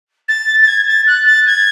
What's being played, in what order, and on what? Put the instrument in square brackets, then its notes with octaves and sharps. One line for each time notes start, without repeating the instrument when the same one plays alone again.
[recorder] A6
A6
G#6
A6
F#6
A6
G#6